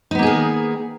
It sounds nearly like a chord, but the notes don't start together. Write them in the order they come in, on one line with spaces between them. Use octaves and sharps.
D#4 B3 A#3 G#4 D#3